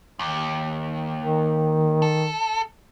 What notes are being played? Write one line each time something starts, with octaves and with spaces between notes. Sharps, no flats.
D#2
D#3
A4